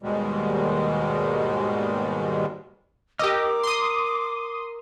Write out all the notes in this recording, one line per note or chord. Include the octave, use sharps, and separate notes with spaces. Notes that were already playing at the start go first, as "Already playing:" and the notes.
D#2 G#2 B2 D#3 G3 G#3
G4 A#4 D#5 D6 E6 F6
C6 D#6